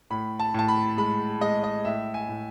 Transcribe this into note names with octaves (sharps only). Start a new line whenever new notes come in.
A2 B5
A5
A2 A5
B5
G#3 B5
G#3 D#5
D#5
A2 E5
G#5
A2